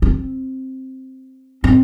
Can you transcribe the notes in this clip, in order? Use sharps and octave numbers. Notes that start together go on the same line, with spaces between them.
C4
C4